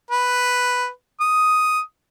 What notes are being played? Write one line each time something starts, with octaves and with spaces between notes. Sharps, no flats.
B4
D#6